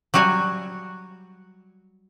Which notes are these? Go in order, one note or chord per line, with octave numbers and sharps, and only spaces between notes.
F#3 G3 F#4 G#5